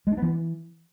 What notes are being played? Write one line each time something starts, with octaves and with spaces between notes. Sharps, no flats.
G#3
D4
B3
E3